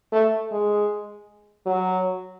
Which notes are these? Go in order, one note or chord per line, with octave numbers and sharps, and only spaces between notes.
A3
G#3
F#3